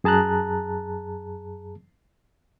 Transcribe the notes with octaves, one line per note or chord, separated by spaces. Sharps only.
F#2 G#4 A5 A#5 F#6